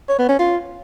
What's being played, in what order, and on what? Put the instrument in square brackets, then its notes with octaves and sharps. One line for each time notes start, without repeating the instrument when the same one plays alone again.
[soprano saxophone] C#5
B3
C#4
F4